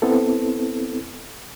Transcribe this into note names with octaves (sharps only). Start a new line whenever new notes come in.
B3 C4 E4 A4